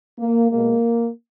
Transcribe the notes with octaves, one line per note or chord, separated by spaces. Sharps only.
A#3
B2 G#3 A#3